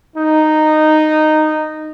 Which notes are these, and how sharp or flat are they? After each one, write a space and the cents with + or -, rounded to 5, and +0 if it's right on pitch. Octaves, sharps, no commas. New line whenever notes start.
D#4 -10